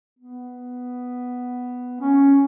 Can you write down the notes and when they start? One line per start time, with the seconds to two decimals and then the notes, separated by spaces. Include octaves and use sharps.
0.19 B3
2.01 C#4